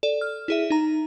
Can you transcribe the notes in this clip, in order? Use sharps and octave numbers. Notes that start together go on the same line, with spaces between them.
A4 D5
F6
E4 G#4 E5
D#4 A#5